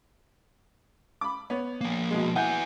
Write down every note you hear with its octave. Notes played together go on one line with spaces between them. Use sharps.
B5 D6
B3 C#5
F3 A#3
B2 G#3
B3 E4 F#5 G#5 G6